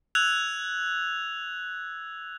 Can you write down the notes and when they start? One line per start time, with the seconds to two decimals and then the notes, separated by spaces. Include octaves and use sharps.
0.15 E6 F#6 G#6 F7